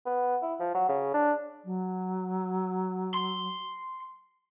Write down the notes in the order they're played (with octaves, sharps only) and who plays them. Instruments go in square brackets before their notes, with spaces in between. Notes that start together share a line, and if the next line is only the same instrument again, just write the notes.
[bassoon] B3
E4
F3
F#3
C#3
D4
[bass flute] F#3
[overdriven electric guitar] C6